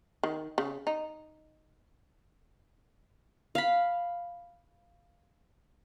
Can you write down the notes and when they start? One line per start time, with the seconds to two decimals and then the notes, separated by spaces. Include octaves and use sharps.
0.23 D#3
0.58 C#3
0.87 D#4
3.55 F5 B5